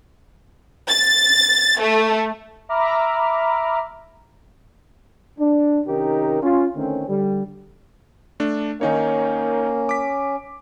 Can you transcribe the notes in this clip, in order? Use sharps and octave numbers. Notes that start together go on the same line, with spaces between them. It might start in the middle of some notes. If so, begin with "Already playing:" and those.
A6
A3
E5 A#5 B5 D6 F6
D4
C3 D#3 C#4 D#4 G4 A#4
C#4 F4
D3 D#3 A3 C4 C#4
D3 G3
A3 D4
D#3 A#3 C#4 D#4 C#5
D6 B6